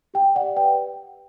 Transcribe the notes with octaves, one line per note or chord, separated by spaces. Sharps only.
G4 G5
D5 F#5
B4 G5